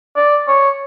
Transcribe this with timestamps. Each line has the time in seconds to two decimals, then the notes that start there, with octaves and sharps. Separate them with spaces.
0.16 D5
0.48 C#5